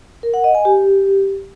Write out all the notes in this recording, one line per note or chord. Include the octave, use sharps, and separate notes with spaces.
A#4
F#5
D#5
G#5
G4